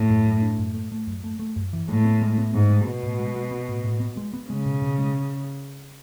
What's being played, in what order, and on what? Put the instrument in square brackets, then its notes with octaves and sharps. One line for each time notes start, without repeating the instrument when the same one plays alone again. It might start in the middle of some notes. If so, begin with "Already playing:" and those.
Already playing: [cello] A2
[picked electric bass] F#2
F#2
D4
F#2
A3
A3
F#2
A3
A3
F#2
E3
[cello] A2 [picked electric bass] G#3
[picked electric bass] B3
G#3
B3
[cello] G#2 [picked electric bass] B3
[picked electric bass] G#3
[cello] B2 [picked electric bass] B3
[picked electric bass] A2
G#3
G#3
B3
A2
A2
B3
G#3
B3
[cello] C#3 [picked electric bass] G#3
[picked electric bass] B2
B2
G#3